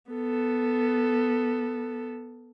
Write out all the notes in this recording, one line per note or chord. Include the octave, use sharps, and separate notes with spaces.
B3 A4